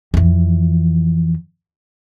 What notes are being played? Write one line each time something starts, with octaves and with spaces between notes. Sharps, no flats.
F2 E3